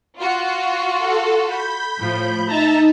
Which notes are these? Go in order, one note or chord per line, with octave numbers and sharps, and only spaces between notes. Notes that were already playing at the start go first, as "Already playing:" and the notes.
F4 F#4
A4
B5 G6
A2 F3
D#4 E5 A5 A#5